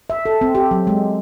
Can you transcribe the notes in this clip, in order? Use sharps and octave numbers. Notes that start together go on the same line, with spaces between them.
E5
A4
C4
G4
F#3
G#3